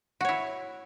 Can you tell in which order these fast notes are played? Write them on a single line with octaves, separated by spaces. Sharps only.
F#4 C#5 E4